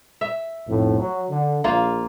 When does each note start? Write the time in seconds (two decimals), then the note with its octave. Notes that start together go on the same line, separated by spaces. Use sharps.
0.21 E5
0.68 B1 F2 A2
0.99 F#3
1.30 D3
1.64 A#1 A#3 F4